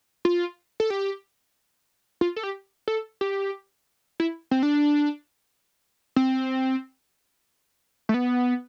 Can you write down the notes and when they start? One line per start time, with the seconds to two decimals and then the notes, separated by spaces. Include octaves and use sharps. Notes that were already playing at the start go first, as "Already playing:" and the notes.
0.25 F4
0.80 A4
0.90 G4
2.21 F4
2.36 A4
2.43 G4
2.88 A4
3.21 G4
4.20 E4
4.51 C4
4.63 D4
6.16 C4
8.09 A3
8.14 B3